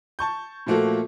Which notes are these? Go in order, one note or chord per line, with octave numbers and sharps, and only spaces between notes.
A5 C#6 G6
A#2 F3 A3 A#3 F#4 A4